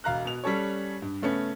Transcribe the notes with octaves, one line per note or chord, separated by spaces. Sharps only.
E1 F5 A#5 F#6
B2 F7
G3 C#4 A4 C#5
G2
C#3 A3 B3 C#4